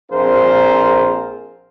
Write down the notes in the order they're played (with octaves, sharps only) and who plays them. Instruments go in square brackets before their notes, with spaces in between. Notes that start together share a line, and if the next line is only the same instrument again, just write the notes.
[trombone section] A#1 C4 F4 G#4 A#4 C5